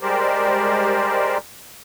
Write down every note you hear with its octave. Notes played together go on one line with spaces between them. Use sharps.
G3 G#3 G4 A#4 C5 D5